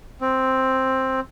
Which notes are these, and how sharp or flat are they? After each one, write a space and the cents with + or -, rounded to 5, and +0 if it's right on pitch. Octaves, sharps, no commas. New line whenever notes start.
C4 +5